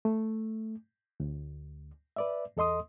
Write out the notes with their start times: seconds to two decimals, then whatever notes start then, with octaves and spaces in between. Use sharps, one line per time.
0.05 A3
1.20 D2
2.16 B4 D5 E5
2.57 E2 A4 D#5 C6 D#6